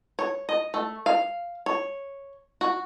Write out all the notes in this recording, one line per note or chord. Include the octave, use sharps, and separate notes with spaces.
C#5
D#5
A3
F5
C#5
F#4